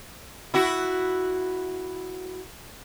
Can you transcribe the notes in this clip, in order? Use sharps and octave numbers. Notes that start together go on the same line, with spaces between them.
E4 F#4